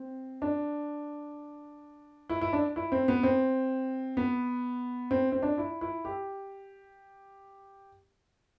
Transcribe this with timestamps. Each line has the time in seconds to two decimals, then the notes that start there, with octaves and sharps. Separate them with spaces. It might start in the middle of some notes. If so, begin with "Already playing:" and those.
Already playing: C4
0.42 D4
2.29 E4
2.41 E4
2.53 D4
2.76 E4
2.92 C4
3.08 B3
3.23 C4
4.17 B3
5.11 C4
5.32 C4
5.43 D4
5.58 E4
5.81 E4
6.05 G4